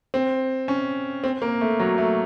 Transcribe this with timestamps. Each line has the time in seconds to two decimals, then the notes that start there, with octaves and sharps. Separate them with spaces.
0.14 C4
0.68 C#4
1.24 C4
1.42 A#3
1.61 A3
1.80 F#3
1.98 A3